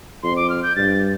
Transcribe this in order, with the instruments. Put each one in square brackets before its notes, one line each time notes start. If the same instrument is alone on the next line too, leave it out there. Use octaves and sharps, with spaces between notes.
[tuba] F2 [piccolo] C6
[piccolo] D6
F6
G6
[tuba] G2 [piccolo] A6